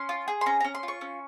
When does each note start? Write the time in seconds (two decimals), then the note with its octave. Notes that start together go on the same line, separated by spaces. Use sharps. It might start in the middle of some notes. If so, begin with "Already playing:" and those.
Already playing: C#4 C6
0.09 F4
0.28 G#4
0.41 C6
0.46 C#4 A#5
0.61 C#4 A#5
0.75 C6
0.83 F4
0.88 C#6
1.01 C#4